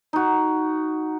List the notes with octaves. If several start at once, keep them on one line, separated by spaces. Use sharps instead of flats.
D#4 F#4